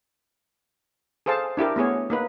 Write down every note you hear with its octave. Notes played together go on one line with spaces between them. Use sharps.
G#4 A4 C5 F5 A5
D4 E4 G4 A#4
A3 B3 G#4 C#5
A#3 D#4 B4